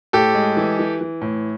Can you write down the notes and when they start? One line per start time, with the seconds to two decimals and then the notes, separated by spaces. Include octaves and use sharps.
0.13 A2 G4 A4
0.35 G#3
0.57 E3
0.79 E3
1.01 E3
1.22 A2